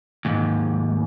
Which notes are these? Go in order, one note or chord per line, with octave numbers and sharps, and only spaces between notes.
D#2 G#2